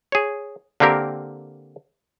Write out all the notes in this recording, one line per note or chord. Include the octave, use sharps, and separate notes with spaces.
G#4 C#5
D3 A#3 C4 G4 A#4